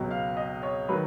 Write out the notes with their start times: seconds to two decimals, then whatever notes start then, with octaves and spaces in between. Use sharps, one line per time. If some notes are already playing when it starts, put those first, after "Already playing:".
Already playing: C#2 B2 F#3
0.11 F5
0.37 D#5
0.63 C#5
0.89 D#3 F#3 B4